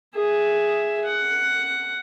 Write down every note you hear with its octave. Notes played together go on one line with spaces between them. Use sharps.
G#4 E5
F#5